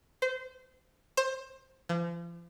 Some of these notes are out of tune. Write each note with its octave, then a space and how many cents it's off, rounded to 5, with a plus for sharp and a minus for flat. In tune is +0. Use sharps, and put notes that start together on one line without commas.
C5 -25
C5 +20
F3 -40